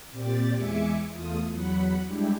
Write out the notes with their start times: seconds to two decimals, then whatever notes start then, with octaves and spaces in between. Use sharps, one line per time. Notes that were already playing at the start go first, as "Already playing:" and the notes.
0.11 A#2 C4 G4 D5 A6
0.53 E2 G#3 E5 G#5 D6 C#7
1.13 E2 A3 F4 D#6
1.51 E2 F#3 F#5 B5
2.06 G3 G#3 D4 E4 G4